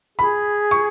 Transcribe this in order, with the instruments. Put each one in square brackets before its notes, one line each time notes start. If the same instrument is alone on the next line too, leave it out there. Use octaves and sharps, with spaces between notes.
[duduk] G#4 [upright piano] B5
[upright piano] C#6